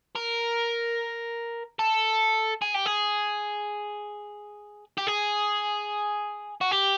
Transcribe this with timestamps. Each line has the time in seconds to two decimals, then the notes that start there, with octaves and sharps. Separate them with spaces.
0.16 A#4
1.79 A4
2.62 G#4
2.74 G4
2.86 G#4
4.98 G4
5.07 G#4
6.61 F#4
6.71 G4